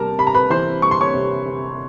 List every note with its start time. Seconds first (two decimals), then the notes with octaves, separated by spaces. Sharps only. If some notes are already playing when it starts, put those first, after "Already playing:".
Already playing: C3 G3 A#4 A5 A#5
0.18 C3 B5
0.27 A#5
0.35 B4 B5
0.50 E3 C5 C6
0.82 G3 C#6
0.91 C6
1.01 C#5 C#6
1.14 C3
1.46 C3